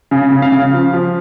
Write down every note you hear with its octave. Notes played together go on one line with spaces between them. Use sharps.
C#3 G#5
C#3
F5
C#3
F3
F3